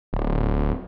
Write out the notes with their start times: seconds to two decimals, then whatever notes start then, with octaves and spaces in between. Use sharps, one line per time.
0.13 D1